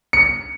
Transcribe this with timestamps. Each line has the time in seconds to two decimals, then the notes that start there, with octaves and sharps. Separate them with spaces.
0.13 C#7